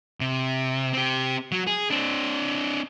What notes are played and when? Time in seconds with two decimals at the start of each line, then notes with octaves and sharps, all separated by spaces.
0.20 C3
0.93 C4 G4
1.52 F#3
1.67 G#4
1.91 C4 D4